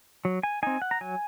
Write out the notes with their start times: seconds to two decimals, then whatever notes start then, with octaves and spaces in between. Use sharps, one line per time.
0.25 F#3
0.43 G#5
0.63 C4 D#4 G#5
0.82 F#5
0.91 A#5
1.01 F#3 G#5